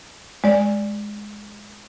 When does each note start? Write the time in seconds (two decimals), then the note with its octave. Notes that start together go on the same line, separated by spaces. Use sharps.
0.44 G#3 D5